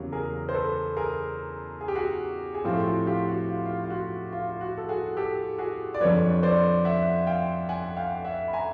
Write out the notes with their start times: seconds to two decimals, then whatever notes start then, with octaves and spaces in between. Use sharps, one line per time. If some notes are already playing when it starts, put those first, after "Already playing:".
Already playing: E2 C#3 F#3 A#3 G4
0.12 G#4 A#4
0.49 C5
0.55 A4 B4
0.97 G#4 A#4
1.81 G#4
1.88 G4
1.95 F#4 G#4
2.55 G#4
2.64 A2 F3 A3 C4 F4 G4
2.86 F#4
3.07 F4 G4
3.28 F#4
3.49 F4
3.66 F4
3.84 F4
3.90 F#4
4.32 F4
4.50 F4
4.61 F#4
4.77 A4
4.89 F#4 G#4
5.17 G4 A4
5.58 F#4 G#4
5.94 D5
6.01 F2 D3 F3 B4 C#5
6.43 C5 D5
6.85 E5 F#5
7.27 F5 G5
7.69 F#5 G#5
7.91 F#5
7.97 F5 G5
8.25 E5 F#5
8.48 B5
8.53 G#5 A#5